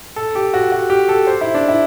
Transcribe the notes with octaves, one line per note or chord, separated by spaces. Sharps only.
A4
G4
F#4
F#4
G4
A4
C5
E4
D4
E4